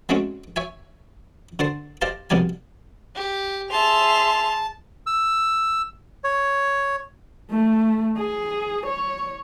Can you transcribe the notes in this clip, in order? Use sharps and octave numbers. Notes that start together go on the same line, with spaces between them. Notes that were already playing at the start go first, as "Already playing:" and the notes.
F#3 G#3 A3 C4 C#4 F#4
C#5 E5 G#5
D3 C5 A5 C6
G4 C5 D5 D#5 F5 A5
C2 B2 F3 D5 G#5
G4
G#4 E5 A5 C6 F7
E6
C#5
A3
G#4
C#5